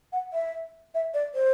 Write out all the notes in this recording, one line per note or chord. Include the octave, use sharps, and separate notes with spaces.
F#5
E5
E5
D5
C5